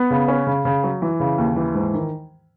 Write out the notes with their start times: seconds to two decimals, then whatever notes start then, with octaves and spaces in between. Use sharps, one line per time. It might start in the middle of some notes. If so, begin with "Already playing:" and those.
Already playing: B3
0.10 C#3
0.28 C#4
0.47 C#3
0.65 C#3
0.83 F#3
1.02 E3
1.20 C#3
1.38 D#2
1.56 E3
1.74 G#2
1.94 D#3